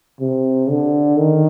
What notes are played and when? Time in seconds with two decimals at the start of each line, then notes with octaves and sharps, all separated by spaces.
0.21 C3
0.70 D3
1.18 D#3